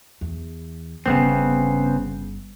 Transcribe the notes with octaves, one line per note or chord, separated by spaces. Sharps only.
E2
G1 C#3 G3 B3 C4